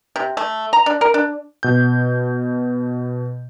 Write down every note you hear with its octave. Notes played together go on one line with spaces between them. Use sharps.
C3
A3
A#5
D4
A#4
D4
B2 G6